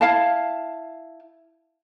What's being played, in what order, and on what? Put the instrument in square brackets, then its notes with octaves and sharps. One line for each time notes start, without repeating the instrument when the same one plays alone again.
[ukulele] E4 F5 A5